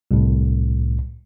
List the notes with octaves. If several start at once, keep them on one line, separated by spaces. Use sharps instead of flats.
C2 A2